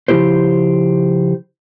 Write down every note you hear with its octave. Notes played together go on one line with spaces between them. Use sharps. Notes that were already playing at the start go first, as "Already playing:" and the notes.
C#3 F3 F#3 E4 G4 C5